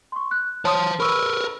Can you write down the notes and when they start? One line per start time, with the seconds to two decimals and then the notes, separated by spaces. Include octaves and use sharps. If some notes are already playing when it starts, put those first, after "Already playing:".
0.12 C6 C#6
0.31 F#6
0.65 C5 C#5 A5 C6 D#6
1.00 A#4 B4 B5 C#6 E6